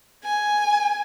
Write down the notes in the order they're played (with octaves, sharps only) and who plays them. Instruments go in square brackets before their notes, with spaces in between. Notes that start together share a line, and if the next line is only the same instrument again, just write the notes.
[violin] G#5